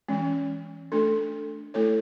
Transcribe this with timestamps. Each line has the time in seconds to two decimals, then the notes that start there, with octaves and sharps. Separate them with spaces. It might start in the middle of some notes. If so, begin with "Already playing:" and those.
0.08 E3 G#3 C#4
0.92 A3 D4 A4
1.74 A3 E4 A4 C#5